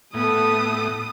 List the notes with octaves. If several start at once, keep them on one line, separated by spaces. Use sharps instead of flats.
A2 B3 A4 D#6